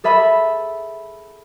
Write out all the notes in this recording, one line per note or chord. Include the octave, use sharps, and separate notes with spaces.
G#4 A4 E5 B5 E6